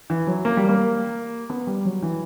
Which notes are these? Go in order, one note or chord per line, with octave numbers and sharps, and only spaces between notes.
E3
F#3
A#3
G3
A#3
B3
G3
F#3
E3